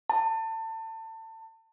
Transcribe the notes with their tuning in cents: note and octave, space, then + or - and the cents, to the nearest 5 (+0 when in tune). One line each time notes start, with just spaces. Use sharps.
A5 +30